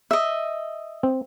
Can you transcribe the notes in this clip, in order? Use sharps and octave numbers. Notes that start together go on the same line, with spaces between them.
D#5 E5
C4